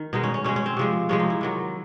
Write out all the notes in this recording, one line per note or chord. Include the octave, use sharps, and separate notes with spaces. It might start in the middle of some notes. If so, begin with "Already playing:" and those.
Already playing: D#3
B2 G#3 D#4
C#4
C#4
B2 G#3 C#4
C#4
C4
C3 F3 G#3
C3 F3 G#3 C#4
D#4
E4
C3 D#3 F#3